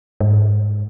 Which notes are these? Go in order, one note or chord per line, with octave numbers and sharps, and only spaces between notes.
G#2